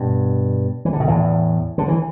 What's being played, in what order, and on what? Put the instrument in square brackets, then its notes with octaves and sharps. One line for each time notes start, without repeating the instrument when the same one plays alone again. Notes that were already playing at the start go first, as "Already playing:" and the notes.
Already playing: [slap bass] G2 B2
E3
D3
B2
E2 A2
D3
E3